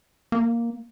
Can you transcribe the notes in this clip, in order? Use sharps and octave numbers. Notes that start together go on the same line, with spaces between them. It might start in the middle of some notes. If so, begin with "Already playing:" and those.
A#3